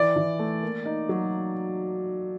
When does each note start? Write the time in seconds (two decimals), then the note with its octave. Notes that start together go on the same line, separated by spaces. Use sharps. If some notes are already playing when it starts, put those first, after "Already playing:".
Already playing: E3 D5
0.16 E3
0.39 A3
0.63 A#3
0.85 D#4
1.09 F#3